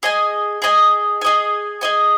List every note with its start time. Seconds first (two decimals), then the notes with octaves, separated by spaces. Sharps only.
0.03 G#4 D#5 G#5
0.62 G#4 D#5 G#5
1.21 G#4 D#5 G#5
1.81 G#4 D#5 G#5